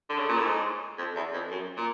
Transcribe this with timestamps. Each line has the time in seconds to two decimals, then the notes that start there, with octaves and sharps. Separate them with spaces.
0.09 D3
0.18 C#3
0.29 A#2
0.37 A2
0.45 G#2
0.98 F2
1.16 E2
1.33 F2
1.51 F#2
1.77 A#2